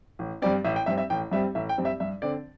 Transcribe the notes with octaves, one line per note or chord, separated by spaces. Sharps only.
A1
G2 G3 C4 D5
A1 E5
G5
G2 G3 C4 E5
E5
A1 G5
G2 G3 C4 E5
A1 E5
G5
G2 G3 C4
E5
G2 E5
D3 C4 D5